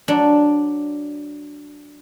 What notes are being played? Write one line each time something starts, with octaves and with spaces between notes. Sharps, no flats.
F#3 D4